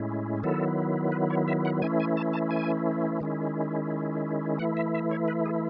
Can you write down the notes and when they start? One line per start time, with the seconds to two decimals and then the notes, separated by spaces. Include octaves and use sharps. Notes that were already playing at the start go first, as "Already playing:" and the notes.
Already playing: A2 G#3 C#4 E4
0.43 D#3 F#3 B3 E4 A4
1.12 B4
1.30 C#5
1.48 E5
1.65 F#5
1.82 E3 A3 C#4 E4 G#5
2.00 G#5
2.17 A5
2.33 A5
2.51 G#5
3.20 D#3 G#3 C#4 E4
4.59 E3 A3 E4 F#5
4.77 E5
4.94 E5
5.11 C#5
5.28 B4
5.46 G#4